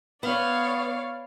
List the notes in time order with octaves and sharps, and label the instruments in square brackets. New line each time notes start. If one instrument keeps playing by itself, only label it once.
[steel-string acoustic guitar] B3 [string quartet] C#5 D5 F5